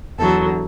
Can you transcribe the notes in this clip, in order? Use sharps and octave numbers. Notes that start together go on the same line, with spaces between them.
E2 D3 F#3 A4